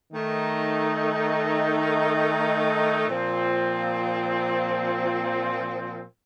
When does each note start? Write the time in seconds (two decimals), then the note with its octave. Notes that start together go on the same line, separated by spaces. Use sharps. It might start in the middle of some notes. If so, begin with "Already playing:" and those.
0.12 D#3 A3 D#4
3.08 A#2 F3 C4